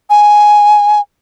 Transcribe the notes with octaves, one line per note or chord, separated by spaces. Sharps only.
G#5